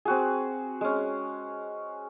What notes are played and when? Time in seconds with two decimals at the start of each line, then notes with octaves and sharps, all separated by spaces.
0.05 C4 F#4 G#4
0.81 G#3 C#4